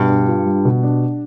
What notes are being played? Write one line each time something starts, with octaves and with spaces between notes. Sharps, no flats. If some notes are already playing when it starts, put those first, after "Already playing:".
Already playing: G2 B2
D4
F4
G3
B2
D4